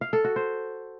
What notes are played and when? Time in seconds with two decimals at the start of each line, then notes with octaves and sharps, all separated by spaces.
0.01 F5
0.13 A4
0.24 F#4
0.36 C5